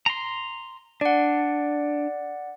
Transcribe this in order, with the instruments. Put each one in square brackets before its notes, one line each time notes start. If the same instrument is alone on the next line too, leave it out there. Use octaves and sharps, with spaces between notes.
[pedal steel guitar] A#5 C6
[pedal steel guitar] D4 [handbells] D5 F#5